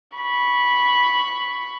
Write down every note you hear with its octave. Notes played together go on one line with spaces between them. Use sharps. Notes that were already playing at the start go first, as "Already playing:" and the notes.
B5 C#6